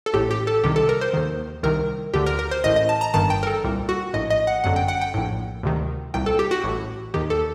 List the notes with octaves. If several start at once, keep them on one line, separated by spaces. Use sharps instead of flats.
A4
A1 A2 G4
G4
A4
C2 C3 D#3 G4
A4
A#4
C5
D#2 D#3
C2 C3 D#3 A#4
D2 D3 G4
A#4
A#4
C5
A1 A2 D#5
D#5
A5
A#5
G1 G2 D#3 A5
G5
A#4
A4
C2 A#2
F#4
A#1 A2 D#5
D#5
F#5
G1 F#2 D3 F#5
G5
F#5
G5
A#1 A2
D2 C3 D#3
C2 A#2 G5
A4
G4
F#4
A1 A2
D#2 D#3 G4
A4